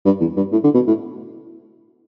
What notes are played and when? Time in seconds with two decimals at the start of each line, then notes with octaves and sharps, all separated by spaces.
0.05 G2
0.20 E2
0.36 G2
0.52 A2
0.64 D3
0.75 B2
0.87 A2